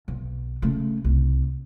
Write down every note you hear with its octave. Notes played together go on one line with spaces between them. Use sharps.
B1
C#3 A3
C2